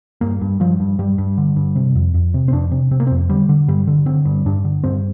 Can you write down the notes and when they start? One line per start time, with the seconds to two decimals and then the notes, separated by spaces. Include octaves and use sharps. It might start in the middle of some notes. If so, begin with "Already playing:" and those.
0.21 G2 A#3
0.41 G2
0.60 G2 F3
0.80 G2
0.99 G2 G3
1.18 G2
1.38 D3
1.56 G2
1.76 C3
1.95 F2
2.14 F2
2.34 C3
2.48 C4
2.52 F2 D4
2.71 C3
2.91 C3 C4
3.00 A#3
3.07 C4
3.11 F2
3.29 D3 G3
3.49 D3
3.68 G2 G3
3.87 D3
4.06 D3 C4
4.25 G2
4.46 G2 D4
4.65 D3
4.84 G2 C4